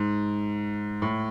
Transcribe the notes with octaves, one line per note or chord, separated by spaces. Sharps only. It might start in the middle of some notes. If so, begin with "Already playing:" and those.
Already playing: G#2
A2